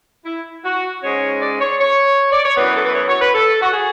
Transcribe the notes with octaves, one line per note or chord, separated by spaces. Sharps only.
E4
F#4
G#2 G#3 C#4 C#5
D5
C#5
C#5
D5
C#5
F#2 E3 B3 B4
A4
B4
C#5
C#5
B4
A4
F#4
G#4